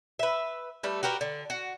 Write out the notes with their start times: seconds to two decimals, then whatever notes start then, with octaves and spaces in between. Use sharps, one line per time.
0.19 B4 E5
0.83 G3 A3 B4
1.03 F#4 G4 A#4 B4
1.21 D3
1.50 F#4